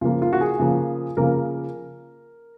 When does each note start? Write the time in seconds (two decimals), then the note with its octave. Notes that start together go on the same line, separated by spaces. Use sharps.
0.01 C#3 F3 A#3 F4
0.22 F4
0.33 F#4
0.41 G#4
0.59 C#3 F3 A#3
1.17 C#3 F3 A#3 A#4